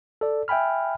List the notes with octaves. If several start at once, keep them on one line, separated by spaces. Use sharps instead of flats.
A4 D5
E5 G5 G#5 B5 F6